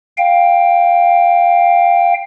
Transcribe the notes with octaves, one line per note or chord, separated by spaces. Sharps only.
F5 G5